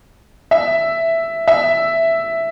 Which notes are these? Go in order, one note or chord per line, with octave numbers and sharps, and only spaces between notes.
E5
E5